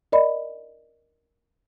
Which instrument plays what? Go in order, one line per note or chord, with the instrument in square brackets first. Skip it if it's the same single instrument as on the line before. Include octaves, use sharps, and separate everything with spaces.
[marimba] A#4 D5 D#5 B5